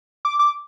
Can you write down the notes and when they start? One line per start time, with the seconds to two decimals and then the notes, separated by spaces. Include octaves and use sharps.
0.25 D6
0.39 D6